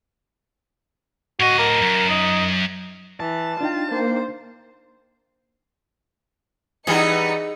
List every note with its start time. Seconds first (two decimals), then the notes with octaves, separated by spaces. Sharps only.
1.40 A2 F#4 D#5
1.59 A#4
1.82 F#2
2.09 D#4
3.20 E3 A5
3.61 D4 D#4 F4 G5
3.91 A#3 C5
6.87 E3 G3 B3 D#4 G#4 C#7